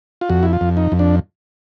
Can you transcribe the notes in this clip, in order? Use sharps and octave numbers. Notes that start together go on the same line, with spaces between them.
F4
F2 F#4
E4
F4
F2
D#4
F2
D4